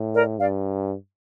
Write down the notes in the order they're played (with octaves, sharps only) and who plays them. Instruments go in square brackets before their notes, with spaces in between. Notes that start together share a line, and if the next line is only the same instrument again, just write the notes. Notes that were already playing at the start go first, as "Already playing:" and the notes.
Already playing: [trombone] A2
[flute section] A#4 D5
[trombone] G2 [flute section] D5 F5